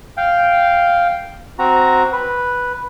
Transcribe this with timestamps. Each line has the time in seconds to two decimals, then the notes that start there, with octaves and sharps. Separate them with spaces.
0.17 F5 G5
1.59 C4 F#4 A#5
2.12 B4